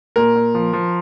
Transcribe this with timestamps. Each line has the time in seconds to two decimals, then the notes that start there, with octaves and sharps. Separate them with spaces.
0.16 A#2 A#4
0.36 A#2
0.55 F3
0.73 F3